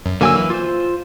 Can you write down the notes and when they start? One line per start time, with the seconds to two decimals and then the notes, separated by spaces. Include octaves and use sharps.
0.06 F#2
0.21 D3 F#3 A#3 G#5 E6
0.35 E3
0.50 F4 C5